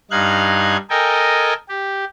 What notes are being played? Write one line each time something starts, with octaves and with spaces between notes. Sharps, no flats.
G2 D#4 F5 F#6 G#6
A4 A#4 D#5 G5 G#5
G4